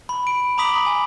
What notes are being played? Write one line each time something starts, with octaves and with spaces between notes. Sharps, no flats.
B5
D7
A#5 B5 D6 D#6 B6 F#7
G#5